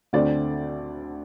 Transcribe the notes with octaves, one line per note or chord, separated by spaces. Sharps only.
D2 D3 A3 C4 D5